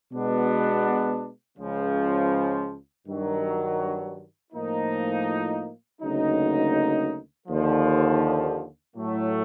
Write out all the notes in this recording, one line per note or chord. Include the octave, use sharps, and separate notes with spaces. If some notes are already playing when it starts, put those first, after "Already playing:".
B2 G#3 B3 D4
C#2 C#3 F3
G2 D#3 F#3
A2 F3 A#3 D#4
D2 C#3 F#3 A#3 D#4
D#2 D3 F3
A2 F#3 A3